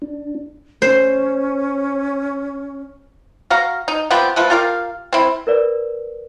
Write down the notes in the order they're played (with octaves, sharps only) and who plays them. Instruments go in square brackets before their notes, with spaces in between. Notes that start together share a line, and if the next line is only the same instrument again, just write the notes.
[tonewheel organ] D4
[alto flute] C#4 [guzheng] C5
[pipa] F#4 F5 A#5
D#4
F3 B3 C4 G4
F3 A3 B4
F4 G4 A#4 F5
C4 E4
[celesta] A#4 B4 D5